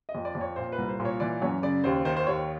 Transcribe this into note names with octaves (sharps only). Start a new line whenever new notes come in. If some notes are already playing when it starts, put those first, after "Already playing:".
D#5
F2
D5
F2
C#5
A#2 C5
B4
C2
C5
A#2
C#5
E3 D5
F#2 C#5
C#3 D5
D#2 C5
D#3 C5
C5
D#2 C#5